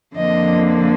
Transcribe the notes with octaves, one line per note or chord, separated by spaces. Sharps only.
F2 D3 F3 A#3 D#5